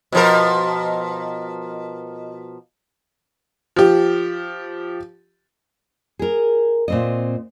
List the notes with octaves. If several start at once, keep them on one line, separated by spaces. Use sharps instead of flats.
B2 F3 A#4
F3 G4
G#4 A#4
A#2 C4 D#5